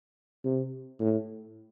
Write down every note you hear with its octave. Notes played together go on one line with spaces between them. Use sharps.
C3
A2